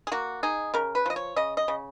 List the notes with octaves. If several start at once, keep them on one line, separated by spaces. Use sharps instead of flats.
G#4
A#3 F#4
D#4 G#4
C#3 A#4
B4
F3 D#5
C#5
C#3 D#5
D#5
C#3